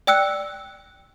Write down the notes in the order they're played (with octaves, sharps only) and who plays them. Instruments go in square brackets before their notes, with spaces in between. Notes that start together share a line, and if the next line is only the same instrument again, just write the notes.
[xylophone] D5 G5 E6 F#6 C#7